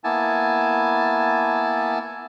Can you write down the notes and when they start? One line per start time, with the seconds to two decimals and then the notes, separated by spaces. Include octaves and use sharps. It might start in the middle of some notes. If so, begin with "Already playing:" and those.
0.04 A#3 B3 E4 G#5 A5